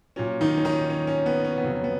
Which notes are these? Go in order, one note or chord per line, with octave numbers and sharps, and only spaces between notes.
A#2 F#3 C#4
D#3 D#4
C#4
D#3 D#4
C#4
C#4
B3
C#4
B3
F2 C#3 F#3
B3